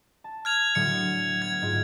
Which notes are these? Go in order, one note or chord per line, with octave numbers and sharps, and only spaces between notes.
A5
F6 G#6 F7
A2 D3 F#3 C#7
B3 G#6
G#2 F4